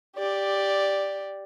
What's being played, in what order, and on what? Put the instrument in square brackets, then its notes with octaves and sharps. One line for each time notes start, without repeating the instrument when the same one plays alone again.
[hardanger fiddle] G4 D5